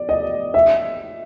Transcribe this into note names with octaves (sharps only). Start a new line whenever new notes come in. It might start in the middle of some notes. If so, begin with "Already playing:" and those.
Already playing: D5
D#5
E5